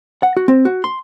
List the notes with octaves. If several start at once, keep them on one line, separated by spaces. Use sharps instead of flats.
F#5
F#4
C4
F#4
C6